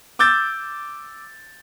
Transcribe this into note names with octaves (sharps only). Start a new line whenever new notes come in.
D6 E6 G6 A6